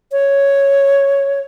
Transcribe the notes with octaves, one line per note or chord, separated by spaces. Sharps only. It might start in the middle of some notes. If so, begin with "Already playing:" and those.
C#5